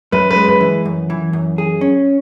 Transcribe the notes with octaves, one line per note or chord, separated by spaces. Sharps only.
F#2 B4
B4
G#3
B4
E3
F#2
E3
F#2
G#4
C#4